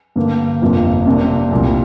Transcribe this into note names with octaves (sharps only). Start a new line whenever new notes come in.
G2 D3 A#3
G1 F2 C3 F3 A#3
C3 A#3 D4
C2 A#2 G3